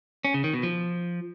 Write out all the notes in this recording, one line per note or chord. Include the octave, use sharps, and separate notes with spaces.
C#4
C#3
D#3
B2
F3